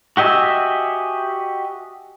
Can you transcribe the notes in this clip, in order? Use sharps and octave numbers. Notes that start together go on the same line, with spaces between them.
F#4 G4 D#5 E5 G#5